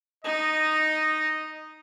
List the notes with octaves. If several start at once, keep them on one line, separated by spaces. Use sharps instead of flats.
D#4 D#5